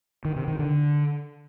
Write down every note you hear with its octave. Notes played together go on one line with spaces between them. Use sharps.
D#3
C3
D#3
D3